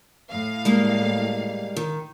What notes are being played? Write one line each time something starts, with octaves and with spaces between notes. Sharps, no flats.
A2 F5
G3 G#3 A#3
D#3